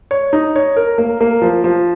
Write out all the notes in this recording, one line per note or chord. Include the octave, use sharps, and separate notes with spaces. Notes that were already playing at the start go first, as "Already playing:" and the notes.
C#5
D#4
C#5
A#4
A#3
A#3
F3
F3